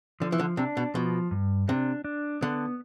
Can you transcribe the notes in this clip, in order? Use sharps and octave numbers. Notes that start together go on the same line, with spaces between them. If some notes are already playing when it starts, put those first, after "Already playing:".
D3 F3
E3
D3
C3 D4
B2
B2 F3
G2
C3 D4
D4
D3 B3